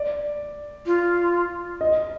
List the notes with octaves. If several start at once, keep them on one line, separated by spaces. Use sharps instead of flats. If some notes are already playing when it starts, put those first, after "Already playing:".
Already playing: D5
F4
D#5